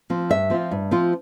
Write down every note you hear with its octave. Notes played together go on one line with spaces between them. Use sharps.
F3 C4
G2 E5
F3 C4 F4
G2
F3 C4 F4